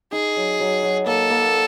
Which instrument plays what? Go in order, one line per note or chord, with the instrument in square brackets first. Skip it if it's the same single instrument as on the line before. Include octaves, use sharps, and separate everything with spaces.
[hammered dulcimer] D#4 [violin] G#4
[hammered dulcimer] F#3
F#3
F#3
[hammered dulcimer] A#3 [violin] A4
[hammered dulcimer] A#3